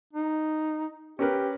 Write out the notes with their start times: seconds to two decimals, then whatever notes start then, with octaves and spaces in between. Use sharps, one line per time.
0.13 D#4
1.19 C#4 G4 A#4 B4